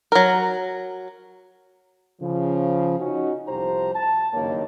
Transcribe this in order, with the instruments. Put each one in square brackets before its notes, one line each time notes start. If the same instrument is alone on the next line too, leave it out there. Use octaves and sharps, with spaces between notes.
[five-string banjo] F#3 A#4
[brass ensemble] C#3 F3
C#4 D#4 F#4
C2 F2 F3 G4 C5 A#5
A5
F#1 G2 D#3 A#3 C#5